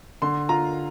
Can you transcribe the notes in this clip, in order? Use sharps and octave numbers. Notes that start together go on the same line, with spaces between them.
D3 C6
F4 A#5